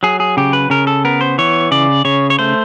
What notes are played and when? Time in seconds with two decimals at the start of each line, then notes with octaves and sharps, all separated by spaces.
0.03 F#3 G#4
0.20 G#4
0.37 C#3 G4
0.53 B4
0.70 C#3 A#4
0.87 A4
1.05 B3 A#4
1.21 C5
1.38 E3 C#5
1.71 C#3 D5
2.05 C#3 C#5
2.30 C#5
2.39 A3 C5